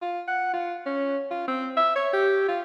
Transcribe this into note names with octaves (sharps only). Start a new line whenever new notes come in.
F4
F#5
F4
C#4
F4
C4
E5
C#5
G4
F4